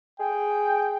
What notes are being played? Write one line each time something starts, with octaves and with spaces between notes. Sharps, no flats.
G#4 G5